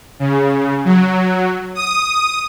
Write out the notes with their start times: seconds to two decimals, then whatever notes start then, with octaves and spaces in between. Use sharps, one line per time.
0.19 C#3
0.85 F#3
1.75 D#6